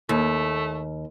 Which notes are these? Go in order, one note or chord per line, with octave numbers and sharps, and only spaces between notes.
D#2 A3